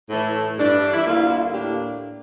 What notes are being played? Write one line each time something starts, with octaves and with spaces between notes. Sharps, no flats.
A2 E3 A3 E4
G2 E3 G3 D4
E4
D2 D3 G3 A#3 F4
E4
A2 A#3 D4 G4